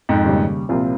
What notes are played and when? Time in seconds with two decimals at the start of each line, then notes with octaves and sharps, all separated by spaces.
0.09 F2 G#2
0.24 D#2 C#3 G3
0.69 C2 A#2 F3 C4 F4